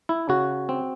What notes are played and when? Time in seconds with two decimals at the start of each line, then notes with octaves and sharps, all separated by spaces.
0.09 E4
0.29 C#3 F#4
0.69 C4